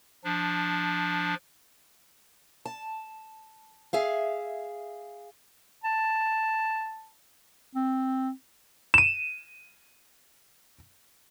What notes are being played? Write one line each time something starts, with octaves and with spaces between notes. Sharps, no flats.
F3 D4
A5
G#4 E5 F5
A5
C4
D#7 E7